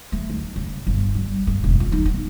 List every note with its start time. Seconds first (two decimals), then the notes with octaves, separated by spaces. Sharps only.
0.12 A3
0.30 D#2
0.56 C#3
0.87 G1
1.15 G3
1.47 G1
1.64 E1
1.80 F4
1.92 D#4
2.05 B3